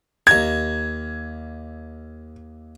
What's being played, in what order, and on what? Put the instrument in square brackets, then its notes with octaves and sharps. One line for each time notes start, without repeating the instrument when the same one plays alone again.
[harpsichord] D#2 A#5 [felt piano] G#6